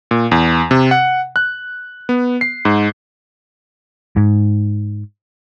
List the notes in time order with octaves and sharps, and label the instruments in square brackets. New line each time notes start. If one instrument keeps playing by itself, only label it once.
[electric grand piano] A#2
E2
C3
F#5
F#6
B3
C7
G#2
[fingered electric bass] G#2